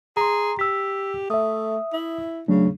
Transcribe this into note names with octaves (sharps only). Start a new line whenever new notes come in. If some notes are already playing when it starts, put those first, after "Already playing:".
G#4 A#5 C6
G4 E6 B6
A3 E5 D#6
E4
C#3 F#3 A3 D4